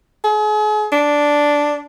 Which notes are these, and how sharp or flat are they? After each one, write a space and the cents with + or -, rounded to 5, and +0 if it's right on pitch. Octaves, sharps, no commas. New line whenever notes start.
G#4 +40
D4 -5